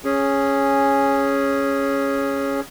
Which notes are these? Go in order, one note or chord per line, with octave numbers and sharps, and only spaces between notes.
C#4 G#4